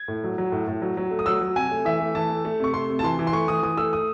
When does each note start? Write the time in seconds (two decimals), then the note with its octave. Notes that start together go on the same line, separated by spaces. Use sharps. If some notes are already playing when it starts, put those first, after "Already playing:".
Already playing: G#6
0.08 A2
0.24 F#3
0.38 F#3
0.52 A2
0.68 A2
0.82 F#3
0.97 F#3
1.11 A3
1.19 D#6
1.26 F#3 E6
1.41 F#3
1.56 C3 G#5
1.71 A3
1.85 E3 E5
2.00 A3
2.15 E3 A5
2.30 A3
2.45 A3
2.60 C3 C#6
2.74 A3 C6
2.90 C3
2.99 A5
3.03 E3 C6
3.19 E3
3.27 C6
3.33 A3 C#6
3.48 E3 D#6
3.63 E3 D#6
3.77 A3 E6
3.93 D#6